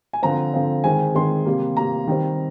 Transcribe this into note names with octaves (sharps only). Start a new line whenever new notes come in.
G#5
D3 F3 C4 A#5
D3 F3 C4
D#3 G#3 C4 G#5
D#3 G#3 C4 C6
C3 G3 A#3
C3 G3 A#3 A#5
D#3 G3 C4